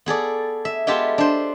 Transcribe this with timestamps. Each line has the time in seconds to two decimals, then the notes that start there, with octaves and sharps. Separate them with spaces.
0.06 B3 G#4 A4 D5
0.65 E5
0.87 G#3 B3 F4 G4 A4 E5
1.18 D4 C5